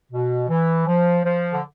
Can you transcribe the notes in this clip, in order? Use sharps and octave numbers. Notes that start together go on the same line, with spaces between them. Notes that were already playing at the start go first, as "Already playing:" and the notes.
B2
E3
F3
F3
D3